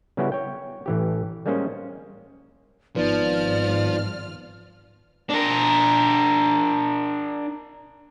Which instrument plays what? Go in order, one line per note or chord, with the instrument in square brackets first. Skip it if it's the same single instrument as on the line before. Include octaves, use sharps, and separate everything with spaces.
[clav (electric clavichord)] C#3 G3 B3 C#4 E4 F#4
C#5 G5
A1 E3 G4
G3 G#3 A#3 C#4 C5 D#5
[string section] G#1 F6 [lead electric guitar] F3 [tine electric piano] B3 D#4 B4 [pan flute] D5
[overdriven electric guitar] D4 A#4